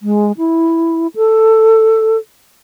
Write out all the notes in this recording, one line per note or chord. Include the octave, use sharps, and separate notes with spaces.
G#3
E4
A4